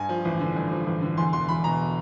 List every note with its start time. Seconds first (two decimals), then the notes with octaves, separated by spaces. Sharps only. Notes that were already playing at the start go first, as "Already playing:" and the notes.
Already playing: G2 G#5
0.09 F3
0.25 A1
0.40 D3
0.56 G2
0.71 F3
0.87 A1
1.02 D3
1.17 E2 C6
1.33 E1 C6
1.49 E1 B5
1.64 B2 A#5